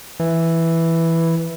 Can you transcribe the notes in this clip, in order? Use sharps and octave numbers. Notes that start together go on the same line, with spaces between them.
E3